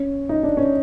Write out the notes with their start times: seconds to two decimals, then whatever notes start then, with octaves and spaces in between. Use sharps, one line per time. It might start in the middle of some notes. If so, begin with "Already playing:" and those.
Already playing: C#4
0.29 D#4
0.43 D4
0.57 C#4